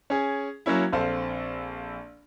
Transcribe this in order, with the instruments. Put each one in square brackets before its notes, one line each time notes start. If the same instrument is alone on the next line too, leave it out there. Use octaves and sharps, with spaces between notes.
[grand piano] C#4 G#4
F#3 A#3 C#4 E4
A#1 C4 A4 F5